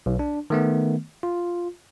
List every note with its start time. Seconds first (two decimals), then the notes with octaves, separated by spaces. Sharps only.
0.06 B1
0.19 D4
0.50 D#3 A3 B3
1.23 F4